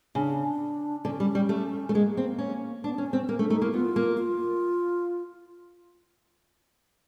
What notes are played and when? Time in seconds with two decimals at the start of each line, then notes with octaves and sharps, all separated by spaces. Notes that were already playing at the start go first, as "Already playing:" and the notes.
0.15 C#3 D4
1.05 D3 C#4
1.20 G3
1.35 G3
1.49 A3
1.89 A3
1.94 G#3 A#3
2.17 C4
2.38 C#4
2.83 B3 D4
2.94 C#4 D4
3.06 C#4
3.13 C4
3.28 A#3 C#4
3.39 A3 D4
3.50 A3 D#4
3.62 A#3 E4
3.73 B3 F4
3.96 A#3
4.18 F4